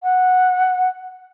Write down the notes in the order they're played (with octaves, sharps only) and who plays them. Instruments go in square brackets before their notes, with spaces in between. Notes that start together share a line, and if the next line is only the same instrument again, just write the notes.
[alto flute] F#5